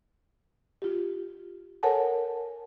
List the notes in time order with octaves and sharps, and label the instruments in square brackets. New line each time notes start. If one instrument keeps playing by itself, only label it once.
[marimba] F4 G4
A4 A#4 C#5 F#5 G#5 A5